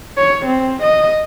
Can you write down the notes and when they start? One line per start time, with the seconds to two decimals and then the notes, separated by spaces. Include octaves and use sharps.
0.17 C#5
0.46 C4
0.83 D#5